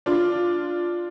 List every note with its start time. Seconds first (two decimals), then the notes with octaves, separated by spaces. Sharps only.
0.06 D4 F4